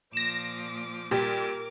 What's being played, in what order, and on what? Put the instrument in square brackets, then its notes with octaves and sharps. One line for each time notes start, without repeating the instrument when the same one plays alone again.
[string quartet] A#2 F3 D6 [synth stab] A#6 E7
[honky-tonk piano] A#2 G3 [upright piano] G4 [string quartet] A#4 D6